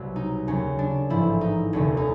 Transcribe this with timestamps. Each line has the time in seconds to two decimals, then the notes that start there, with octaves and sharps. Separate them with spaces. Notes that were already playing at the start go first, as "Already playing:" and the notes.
Already playing: C2 B2 F#3
0.16 D#4
0.47 D#2 C#3 F#3 C#4
0.79 D4
1.10 A1 G#2 F3 E4
1.41 D#4
1.73 F1 D#2 D3 C#4
1.97 D#4